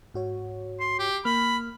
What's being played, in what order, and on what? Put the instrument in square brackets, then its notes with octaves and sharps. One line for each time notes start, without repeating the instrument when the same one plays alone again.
[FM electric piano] G#2 F#4 C#5
[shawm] C6
G4
[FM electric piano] A#3 F6 [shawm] B5